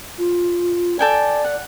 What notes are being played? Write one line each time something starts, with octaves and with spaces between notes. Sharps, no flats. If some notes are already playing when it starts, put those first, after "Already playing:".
F4
A4 D5 G5 G#5
F#5